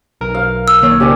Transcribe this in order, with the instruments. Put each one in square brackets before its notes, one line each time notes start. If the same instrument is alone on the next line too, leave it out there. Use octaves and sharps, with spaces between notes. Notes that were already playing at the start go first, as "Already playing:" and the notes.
[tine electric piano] B1 A#4
[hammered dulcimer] F5
[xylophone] E6
[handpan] D#3 A#3 C#5
[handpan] C#3 A#3 C4 [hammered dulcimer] G4 D5 G#5